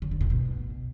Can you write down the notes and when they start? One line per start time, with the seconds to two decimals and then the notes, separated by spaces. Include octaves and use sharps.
0.02 C#3
0.11 D3
0.21 A#2
0.30 B2